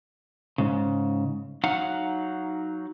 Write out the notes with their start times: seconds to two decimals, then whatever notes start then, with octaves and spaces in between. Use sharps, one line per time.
0.58 G#2 C#3
1.64 F#3 D#4 F5 F#5